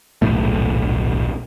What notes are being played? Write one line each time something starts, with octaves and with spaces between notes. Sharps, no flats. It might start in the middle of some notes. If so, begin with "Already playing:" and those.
D#1 B1 A2 A3